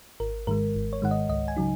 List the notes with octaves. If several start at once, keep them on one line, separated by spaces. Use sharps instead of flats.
G#1 A#4
G#2 D#3 G#3 A#4
G#1
C#5
G#2 D#3 G#3 F#5
D#5
C#2 D#5
G#5
C#3 F#3 D#4